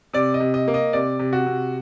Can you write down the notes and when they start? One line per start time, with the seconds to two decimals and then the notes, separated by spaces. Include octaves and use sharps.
0.13 C3 D5
0.34 D#5
0.40 C3
0.54 D#5
0.68 A#3
0.74 D#5
0.93 C3 D5
1.19 C3
1.33 F#4
1.46 C3